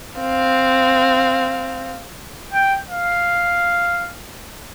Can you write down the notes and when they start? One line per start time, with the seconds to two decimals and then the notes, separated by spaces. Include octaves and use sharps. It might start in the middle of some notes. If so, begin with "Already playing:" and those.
0.18 C4 F5
2.53 G5
2.90 F5